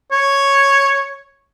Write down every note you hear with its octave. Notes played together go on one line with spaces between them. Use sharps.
C#5